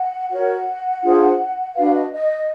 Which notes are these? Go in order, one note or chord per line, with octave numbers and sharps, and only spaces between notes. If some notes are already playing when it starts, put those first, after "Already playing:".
Already playing: F#5
F#4 A#4 C#5 F#5
D4 F4 G#4 C5
D4 F#4 B4 F5
D#5
D#5